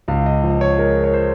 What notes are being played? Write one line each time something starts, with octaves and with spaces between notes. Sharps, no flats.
C#2 F5
D#5
F3
D#5
C#5
G#3 A#4
C#5
C5